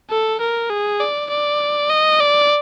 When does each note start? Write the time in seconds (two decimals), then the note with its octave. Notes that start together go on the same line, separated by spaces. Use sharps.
0.10 A4
0.40 A#4
0.70 G#4
1.00 D5
1.30 D5
1.90 D#5
2.20 D5